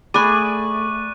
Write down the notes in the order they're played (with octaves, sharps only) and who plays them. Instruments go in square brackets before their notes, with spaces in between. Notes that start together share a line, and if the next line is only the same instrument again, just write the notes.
[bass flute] A3 [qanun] G#4 G#5 [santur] D5 B5 [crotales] C#6 F#6 D#7